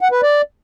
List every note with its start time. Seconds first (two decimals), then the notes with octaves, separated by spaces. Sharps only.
0.01 F#5
0.12 B4
0.23 D5